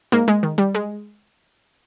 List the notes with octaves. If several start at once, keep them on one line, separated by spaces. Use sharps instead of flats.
G#2 A#3
G#3
D#3
G3
G#3